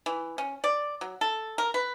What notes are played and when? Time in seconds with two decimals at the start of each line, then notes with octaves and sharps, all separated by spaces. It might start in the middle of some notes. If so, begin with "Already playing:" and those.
0.06 E3
0.38 C#4
0.64 D5
1.01 F#3
1.21 A4
1.58 A#4
1.74 B4